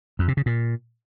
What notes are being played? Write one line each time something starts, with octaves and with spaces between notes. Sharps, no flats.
F2
C3
C#3
A#2